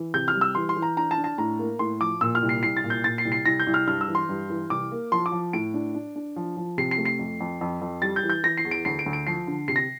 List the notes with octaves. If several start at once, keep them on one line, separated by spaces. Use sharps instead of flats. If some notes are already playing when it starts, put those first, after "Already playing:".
Already playing: E3
C3 G6
F6
G3
E6
E3 C6
C6
E3
A#5
D4 A#5
A5
D4
A5
A2 A#5
A#3
A2 C6
F3 D6
A#2 E6
F6
C2
C7
C2 C7
A6
A#2
G6
A#2 A6
C7
C2
C7
C2 A#6
G6
C2
F6
G2 F6
E6
E3
C6
G2
E3
C2 D6
A#3
F3 C6
D6
F3
A2 D7
D4
D4
D4
F3
F3
C3 C7
C7
A3
C7
F2
F2
F2
F2
G3 A6
G6
E3
G6
E3 A#6
C7
E2
D7
D2 C7
D7
D2
D7
F3 C7
D3
C3 C7
A#6